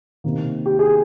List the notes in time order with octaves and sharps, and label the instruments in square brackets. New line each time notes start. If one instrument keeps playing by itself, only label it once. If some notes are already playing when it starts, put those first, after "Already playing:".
[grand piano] C3 D#3 A#3
G4
G#4